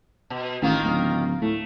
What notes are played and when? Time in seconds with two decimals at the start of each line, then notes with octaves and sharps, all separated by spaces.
0.30 B2
0.62 A1 D#3 A#3 F4
0.83 D1
1.42 A2 A3